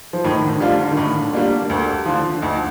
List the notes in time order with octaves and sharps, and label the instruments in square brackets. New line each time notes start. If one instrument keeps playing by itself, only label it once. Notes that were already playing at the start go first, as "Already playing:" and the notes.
[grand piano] F3
[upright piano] A2 [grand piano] D#3
[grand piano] D3
[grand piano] D3 [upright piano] G3 D4 F4
[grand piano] D3
D#3
[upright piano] A2 [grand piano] D3
[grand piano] D3
[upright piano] G3 D4 F4 [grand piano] A#3
[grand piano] A#3
[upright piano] D2 [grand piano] A4
[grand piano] G4
[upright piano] D3 F3 [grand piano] F4
[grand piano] D4
[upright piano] D2 [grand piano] D#4